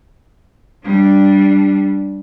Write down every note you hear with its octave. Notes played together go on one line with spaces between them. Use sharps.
G3 D4